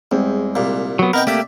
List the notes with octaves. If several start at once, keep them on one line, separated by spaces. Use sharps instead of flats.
E2 G3 G#3 C4
C2 A#2
F#3 B3
C3 B3 D#4 A#4 G5
A3 A#3 G4 D5 E5